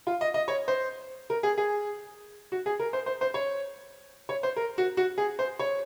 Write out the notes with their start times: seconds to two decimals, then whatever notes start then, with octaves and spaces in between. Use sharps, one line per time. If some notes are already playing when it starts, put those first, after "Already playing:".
0.07 F4
0.21 D#5
0.34 D#5
0.48 C#5
0.68 C5
1.30 A#4
1.43 G#4
1.58 G#4
2.52 F#4
2.66 G#4
2.80 A#4
2.93 C5
3.06 C5
3.21 C5
3.34 C#5
4.29 C#5
4.43 C5
4.56 A#4
4.78 F#4
4.97 F#4
5.18 G#4
5.39 C5
5.59 C#5